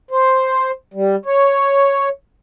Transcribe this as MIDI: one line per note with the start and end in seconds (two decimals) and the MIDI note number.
0.11 0.71 72
0.94 1.16 55
1.25 2.09 73